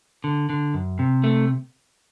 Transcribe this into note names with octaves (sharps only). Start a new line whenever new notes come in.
D3
D3
F#2
C3
A3